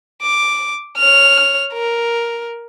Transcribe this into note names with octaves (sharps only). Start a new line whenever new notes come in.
D6
C#5 F6
A#4